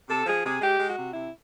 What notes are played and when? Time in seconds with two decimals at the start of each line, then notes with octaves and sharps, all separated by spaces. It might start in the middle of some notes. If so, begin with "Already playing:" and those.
0.09 C3 A4
0.26 F3 G#4
0.44 C3 G#4
0.61 G#3 G4
0.80 G#3
0.86 F#4
0.98 C3
1.10 E4
1.15 C3